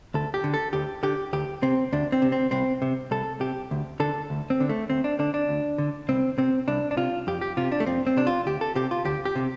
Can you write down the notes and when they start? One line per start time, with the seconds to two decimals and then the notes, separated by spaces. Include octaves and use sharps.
0.14 D2 A4
0.34 G4
0.44 D3
0.54 A4
0.73 D2 G4
1.03 D3 G4
1.33 D2 G4
1.62 C3 C4
1.92 D2 D4
2.12 C4
2.22 C3
2.32 C4
2.51 C2 C4
2.82 C3
3.11 C2 A4
3.40 C3 G4
3.71 D2
4.00 D3 A4
4.30 D2
4.50 C4
4.60 D3
4.69 A3
4.89 D2 C4
5.04 D4
5.19 D3 D4
5.34 D4
5.49 D2
5.78 D3
6.08 C2 C4
6.38 C3 C4
6.68 C2 D4
6.91 D4
6.97 C3 F4
7.27 F2 G4
7.41 G4
7.57 C3 F4
7.72 D4
7.80 A3
7.86 F2 C4
8.07 C4
8.17 C3 D4
8.27 F4
8.46 D2 G4
8.61 A4
8.75 C3 G4
8.91 F4
9.05 D2 G4
9.25 G4
9.36 C3